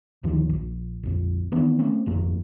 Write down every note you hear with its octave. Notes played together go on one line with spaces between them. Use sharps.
D2 G2 D#3 F3
A#1
A#1 F2
D#3 E3 B3 D4
A3 A#3 C4 C#4
G#1 F2 A#3